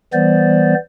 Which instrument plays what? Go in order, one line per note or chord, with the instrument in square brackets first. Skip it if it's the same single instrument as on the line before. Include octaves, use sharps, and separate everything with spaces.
[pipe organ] E3 G3 B3 C5 D5